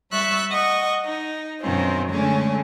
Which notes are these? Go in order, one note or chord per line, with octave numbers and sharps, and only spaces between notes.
G3 E5 C#6 E6 F#6 A6
D#5 F#5 C#6
D#4
F#2 B2 D#3 C4 C#4 F4
D3 G#3 A3 C#4 G#4